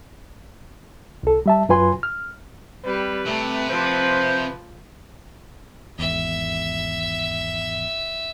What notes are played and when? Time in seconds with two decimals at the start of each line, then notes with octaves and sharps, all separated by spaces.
1.23 C2 A4
1.46 G3 E5 A5
1.69 F#2 F#3 F4 B4 G#5 C6
2.03 F6
2.85 G3 C4 B4
3.26 C3 A3
3.70 F3 C5
5.99 G#1 E2 E5